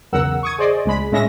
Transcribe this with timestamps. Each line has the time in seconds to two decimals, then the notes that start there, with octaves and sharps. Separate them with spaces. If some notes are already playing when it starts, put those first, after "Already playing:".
0.12 B1 E2 C#3 A#4 F#5 E6
0.43 C#6 D#6 G#6
0.58 G#4 C5 D5 D#5
0.85 C#2 G#3 B5
1.12 A2 G#3 C#4 E5 A#6